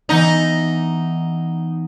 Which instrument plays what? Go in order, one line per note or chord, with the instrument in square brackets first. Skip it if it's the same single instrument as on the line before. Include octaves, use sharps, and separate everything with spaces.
[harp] E3 B3 [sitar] D#4